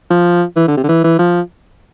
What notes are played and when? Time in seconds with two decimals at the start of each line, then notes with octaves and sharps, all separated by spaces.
0.10 F3
0.56 E3
0.68 D3
0.77 C3
0.83 D3
0.88 E3
1.04 E3
1.19 F3